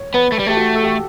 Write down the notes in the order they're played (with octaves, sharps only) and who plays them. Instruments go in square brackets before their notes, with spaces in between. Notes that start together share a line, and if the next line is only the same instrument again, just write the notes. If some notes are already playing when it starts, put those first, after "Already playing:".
Already playing: [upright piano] C#5
[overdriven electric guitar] B3 [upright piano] B4
[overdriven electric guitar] A3
G3
[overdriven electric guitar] A3 [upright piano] G4
[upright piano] F#4
A4
G4